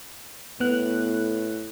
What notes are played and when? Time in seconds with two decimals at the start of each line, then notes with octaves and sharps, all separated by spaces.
0.60 A2 B3 F#6